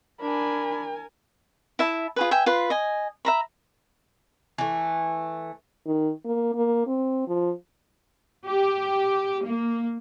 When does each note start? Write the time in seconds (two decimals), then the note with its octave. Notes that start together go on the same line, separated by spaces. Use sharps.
0.21 D4 A#4 G#5 B5
1.79 E4 E5 A5
2.16 F4 G#4 B4
2.31 E5 G5 G#5
2.46 F4 B4 C6
2.70 D#5 G#5
3.25 E5 A#5 B5
4.58 E3 A3
5.86 D#3
6.25 A#3
6.55 A#3
6.87 C4
7.27 F3
8.46 G4
9.43 A#3